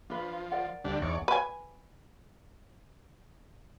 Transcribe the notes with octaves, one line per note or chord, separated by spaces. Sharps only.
F3 D4 B4
A#4 D5 F#5
D2 G3 D4
E2 D#4 C#5 D5
B4 G#5